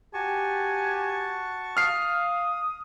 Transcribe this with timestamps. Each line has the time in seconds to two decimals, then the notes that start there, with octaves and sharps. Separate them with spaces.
0.14 F#4 G4 G#5 A5 C#6
1.77 F5 D#6 F6 C7